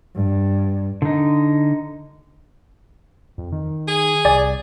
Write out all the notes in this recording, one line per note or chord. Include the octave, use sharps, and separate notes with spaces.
G2
D3 D#4
F2
D#3
G#4
C2 D5 G#5